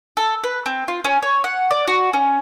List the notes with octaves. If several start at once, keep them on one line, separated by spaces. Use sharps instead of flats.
A4
B4
C4
F4
C#4
C#5
F#5
D5
F#4
C#4